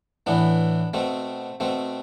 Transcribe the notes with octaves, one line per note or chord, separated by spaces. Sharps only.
A2 E3 B3 D4
B2 A3 C4
B2 A3 C4